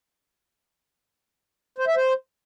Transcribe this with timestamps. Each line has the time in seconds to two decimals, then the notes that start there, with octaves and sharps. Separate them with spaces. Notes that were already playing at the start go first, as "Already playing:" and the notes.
1.78 C5
1.87 E5
1.96 C5